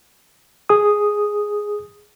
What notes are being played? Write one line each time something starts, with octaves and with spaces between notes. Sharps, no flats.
G#4 D#6